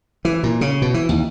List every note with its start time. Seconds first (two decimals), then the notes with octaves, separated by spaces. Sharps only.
0.25 E3
0.43 A#2
0.61 C#3
0.82 B2
0.94 E3
1.09 D#2